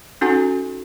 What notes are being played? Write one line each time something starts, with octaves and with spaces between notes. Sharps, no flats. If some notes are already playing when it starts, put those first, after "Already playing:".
C#4 D#4 F#4 A4 F#5 G#5